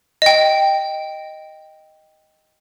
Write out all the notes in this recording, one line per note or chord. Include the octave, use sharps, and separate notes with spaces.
D#5 G5